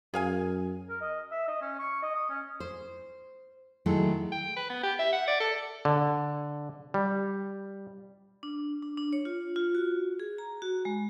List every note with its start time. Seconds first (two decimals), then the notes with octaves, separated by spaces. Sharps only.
0.14 F#2 G#4 F5 G#5
0.89 A#4
1.01 D#5
1.32 E5
1.48 D#5
1.61 C#4
1.80 C#6
2.03 D#5
2.15 D#6
2.30 C#4
2.60 C5
3.86 D#3 F#3 G#3 A3 E4 A4
4.32 G5
4.57 B4
4.70 B3
4.83 G4
4.99 E5
5.13 F#5
5.28 D5
5.40 A4
5.85 D3
6.94 G3
8.43 D4
8.83 D4
8.97 D4
9.13 C#5
9.25 F4
9.56 F4
9.75 F#4
10.20 G#4
10.38 A#5
10.62 F#4
10.85 G#3